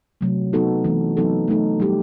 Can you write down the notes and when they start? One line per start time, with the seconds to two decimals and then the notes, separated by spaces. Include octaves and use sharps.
0.21 C3 F#3 A3
0.53 F#3 B3 D#4 F#4 A4
0.84 E3 A3 C4
1.17 F#3 B3 D#4 A4
1.48 A3 D#4 A4
1.80 G3 D#4 G4